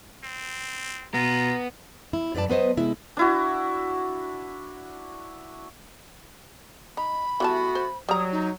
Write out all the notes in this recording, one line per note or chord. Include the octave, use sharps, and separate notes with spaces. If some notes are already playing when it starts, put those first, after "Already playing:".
C4
B2 B3 F4 A#5
E4
F#2 F#3 B4 D5 A5
F#3 B3 B4 C5 D#5
C3 G#3 E4
D4 E4 F#4
D#4 B5
E3 G3 A3 B3 F#4 A5
C5
F#3 G3 A#5 D#6
D#4